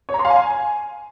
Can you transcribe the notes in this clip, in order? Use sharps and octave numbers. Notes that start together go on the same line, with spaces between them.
C#5
A#5
C6
F5
G#5